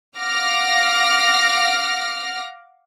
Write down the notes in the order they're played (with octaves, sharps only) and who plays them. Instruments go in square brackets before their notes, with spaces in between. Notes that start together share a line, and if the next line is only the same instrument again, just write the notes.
[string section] F5 F#5 D6 F6 A#6